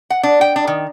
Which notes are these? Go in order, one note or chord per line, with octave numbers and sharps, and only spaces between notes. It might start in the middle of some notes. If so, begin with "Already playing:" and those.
F#5
D4
G5
D4
D#3